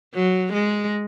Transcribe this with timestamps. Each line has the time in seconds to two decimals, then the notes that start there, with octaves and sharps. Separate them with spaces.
0.15 F#3
0.53 G#3